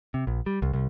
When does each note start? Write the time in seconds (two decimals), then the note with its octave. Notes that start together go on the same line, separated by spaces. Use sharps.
0.14 C3
0.27 A#1
0.46 G3
0.62 C2
0.74 C2